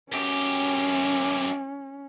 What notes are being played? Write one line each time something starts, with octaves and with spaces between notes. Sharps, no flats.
F#2 C#4 G4